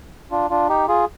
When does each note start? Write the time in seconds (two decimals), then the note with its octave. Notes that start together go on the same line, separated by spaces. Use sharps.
0.31 D4 F4
0.50 D4 F4
0.69 D#4 G4
0.88 F4 G#4